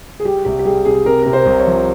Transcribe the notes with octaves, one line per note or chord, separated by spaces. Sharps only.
G#4
G3 G4
C2 G4
G4
G3 G#4
C3 G#4
C3 A#4
C3 A#4
C5
C2
C#5
F3